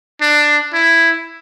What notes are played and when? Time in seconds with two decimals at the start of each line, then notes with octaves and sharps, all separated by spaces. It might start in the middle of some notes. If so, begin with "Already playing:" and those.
0.21 D4
0.73 E4